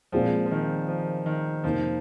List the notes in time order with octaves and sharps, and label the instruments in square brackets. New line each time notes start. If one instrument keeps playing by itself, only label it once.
[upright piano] A#2 G#3 C4 F4 [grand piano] F3
[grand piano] F3
D#3
F3
D#3
[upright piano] F2 C3 D#3 A#3 [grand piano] F3